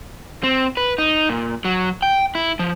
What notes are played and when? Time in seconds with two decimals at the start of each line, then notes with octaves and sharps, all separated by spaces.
0.43 C4
0.77 B4
0.98 D#4
1.29 A#2
1.65 F#3
2.02 G5
2.35 E4
2.59 F3